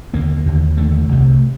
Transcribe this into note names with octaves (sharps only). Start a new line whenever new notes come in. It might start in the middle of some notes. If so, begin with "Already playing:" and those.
D#2 D3 A#3
D#2 D3
D#2 D3 A3
C2 C3